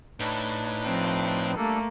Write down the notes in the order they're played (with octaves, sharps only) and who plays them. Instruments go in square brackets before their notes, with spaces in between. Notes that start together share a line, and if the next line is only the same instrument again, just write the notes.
[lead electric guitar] A2 [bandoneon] D4 D#4 B4
[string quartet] F3 C4
[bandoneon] G3 D4 A4 [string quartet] A3 A#3